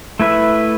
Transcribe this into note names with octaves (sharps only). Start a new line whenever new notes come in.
A3 E4 B4 E5